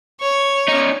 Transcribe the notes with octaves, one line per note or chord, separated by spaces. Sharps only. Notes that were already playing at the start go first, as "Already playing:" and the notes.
C#5 C#6
C#4 D#4